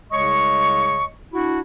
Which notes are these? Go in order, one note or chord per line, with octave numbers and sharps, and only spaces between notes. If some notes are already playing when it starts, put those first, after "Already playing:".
C2 C#3 G#3 C#5 D#5 C#6
D4 E4 F#4